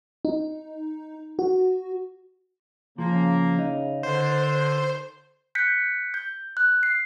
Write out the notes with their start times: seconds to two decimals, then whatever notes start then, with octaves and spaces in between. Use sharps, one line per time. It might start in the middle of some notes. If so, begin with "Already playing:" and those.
0.25 D#4
1.39 F#4
2.98 C#3 F3 A#3
3.59 D#4
4.03 D3 C5
5.55 F#6 G6 B6 C#7
6.14 G6
6.57 F#6
6.83 C7